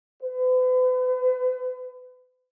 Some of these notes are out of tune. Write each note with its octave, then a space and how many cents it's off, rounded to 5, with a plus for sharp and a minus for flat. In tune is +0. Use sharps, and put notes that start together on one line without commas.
B4 +40